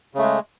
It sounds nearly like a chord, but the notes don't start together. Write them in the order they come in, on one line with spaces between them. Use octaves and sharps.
C#3 A3 G#3